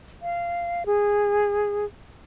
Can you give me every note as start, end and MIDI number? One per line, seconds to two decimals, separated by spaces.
0.22 0.83 77
0.86 1.85 68